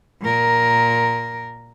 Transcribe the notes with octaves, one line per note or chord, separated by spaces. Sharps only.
A#2 A#4